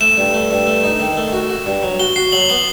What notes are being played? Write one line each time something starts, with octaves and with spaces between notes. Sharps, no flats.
A3 E7
G2
A3
G2
A3
D#4
D#3
A3
F#4
F#4
G2
F#3
F#4 G7
F#4 C7
F#3 F#7
B3 F#7